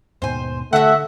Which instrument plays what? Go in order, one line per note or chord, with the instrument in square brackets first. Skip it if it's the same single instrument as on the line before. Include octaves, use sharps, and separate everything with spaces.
[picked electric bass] D#2 G#2 B2 [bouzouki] C5 G#5
[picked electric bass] D3 [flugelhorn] A3 [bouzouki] F#4 F#5 [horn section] E5